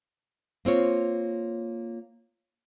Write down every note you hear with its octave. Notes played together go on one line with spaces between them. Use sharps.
A#3 C4 F4 C#5